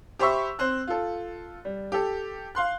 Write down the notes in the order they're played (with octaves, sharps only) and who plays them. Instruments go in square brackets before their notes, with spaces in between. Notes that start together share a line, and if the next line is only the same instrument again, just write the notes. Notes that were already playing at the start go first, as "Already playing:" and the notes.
[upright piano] G4 C5 E5 B5 C#6 E6
C4 C5 F#6
F4 A4
G3
G4 A4
F5 C6 F#6